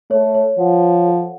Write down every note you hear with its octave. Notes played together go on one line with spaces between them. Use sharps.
A3 C#5
C#5
F3 F#5
F#5
A4